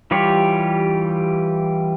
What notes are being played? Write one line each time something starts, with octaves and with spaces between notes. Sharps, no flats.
E3 G3 F4 G4 C#5